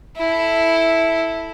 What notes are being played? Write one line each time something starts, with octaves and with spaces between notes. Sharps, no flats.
E4 A4